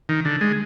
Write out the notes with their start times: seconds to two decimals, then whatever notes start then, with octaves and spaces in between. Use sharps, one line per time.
0.09 D#3
0.25 D3
0.41 G#3